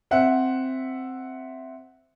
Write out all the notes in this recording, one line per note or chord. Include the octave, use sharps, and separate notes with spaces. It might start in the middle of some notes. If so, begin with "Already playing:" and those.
C4 E5 F#5